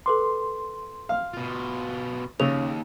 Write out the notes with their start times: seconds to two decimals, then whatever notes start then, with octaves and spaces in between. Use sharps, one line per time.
0.06 A4 B4 C6 D6
1.09 F5
1.34 B2 F4
2.40 D#2 C#3 E6 F7